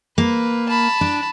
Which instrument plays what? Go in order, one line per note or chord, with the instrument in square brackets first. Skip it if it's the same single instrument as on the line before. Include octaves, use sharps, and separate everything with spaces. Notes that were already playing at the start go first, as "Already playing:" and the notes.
[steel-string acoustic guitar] A#3 [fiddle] B4
[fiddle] A5 B5
[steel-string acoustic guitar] D4